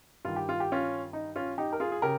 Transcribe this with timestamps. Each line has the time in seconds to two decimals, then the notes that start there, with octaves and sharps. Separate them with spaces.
0.25 G2 D#3 F4
0.36 G4
0.49 F4
0.60 G4
0.72 C#4 F4
1.13 D#4
1.36 C#4 F4
1.58 D#4 G4
1.73 A#4
1.80 F4 G#4
1.92 G#4
2.02 C#3 G4 A#4